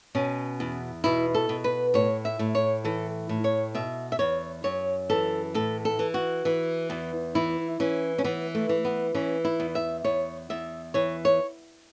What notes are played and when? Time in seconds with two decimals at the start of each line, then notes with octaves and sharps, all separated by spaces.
0.15 B2 C#4
0.60 E2
1.04 B2 E4
1.34 A4
1.49 B2
1.64 B4
1.94 A2 C#5
2.25 E5
2.39 A2
2.55 C#5
2.84 E3 A4
3.29 A2
3.44 C#5
3.75 B2 E5
4.12 E5
4.19 E2 C#5
4.64 F#2 C#5
5.10 E3 A4
5.54 A2 A4
5.85 A4
5.99 E3
6.14 F#4
6.45 E3
6.90 E2
7.35 E3 E4
7.80 E3 C#4
8.18 C#4
8.24 E3 B3
8.55 A3
8.69 E3
8.85 B3
9.15 E3 C#4
9.45 E4
9.60 E2
9.75 E5
10.04 E2 C#5
10.50 E2 E5
10.94 E3 C#5
11.25 C#5